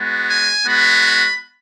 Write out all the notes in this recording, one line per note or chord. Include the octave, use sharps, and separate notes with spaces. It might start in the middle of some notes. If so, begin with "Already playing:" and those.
Already playing: G#3 B3 F#4
G#5
G#3 B3 F#4 B5